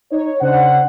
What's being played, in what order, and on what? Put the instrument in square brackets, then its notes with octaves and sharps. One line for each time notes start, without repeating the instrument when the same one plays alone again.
[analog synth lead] D#4 [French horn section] C#5
[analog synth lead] C#3 [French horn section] D4 C5 [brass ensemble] F#5